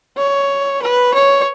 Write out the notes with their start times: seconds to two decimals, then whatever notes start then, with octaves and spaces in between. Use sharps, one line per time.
0.18 C#5
0.83 B4
1.14 C#5